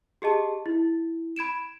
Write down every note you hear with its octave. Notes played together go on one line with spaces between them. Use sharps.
G4 G#4 D#5 A5
E4
B5 G#6 D7 E7